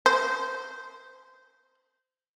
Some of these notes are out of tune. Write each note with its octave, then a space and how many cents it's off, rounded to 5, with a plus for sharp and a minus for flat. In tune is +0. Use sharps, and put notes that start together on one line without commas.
C5 -20